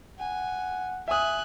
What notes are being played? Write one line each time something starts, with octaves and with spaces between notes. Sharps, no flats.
F#5 G#5
E5 G#5 D#6 F#6